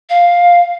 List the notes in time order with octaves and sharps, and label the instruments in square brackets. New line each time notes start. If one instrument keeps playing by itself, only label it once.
[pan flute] F5